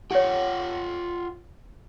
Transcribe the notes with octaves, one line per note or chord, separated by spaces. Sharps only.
F4 G4 C#5 F#5 G5